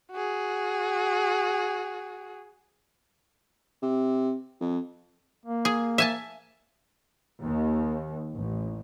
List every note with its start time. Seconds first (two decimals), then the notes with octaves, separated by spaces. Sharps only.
0.11 F#4 G#4
3.82 C3
4.60 F2
5.46 A#3
5.65 G#4
5.98 E5 G#5 A5
7.40 D#2
8.36 A1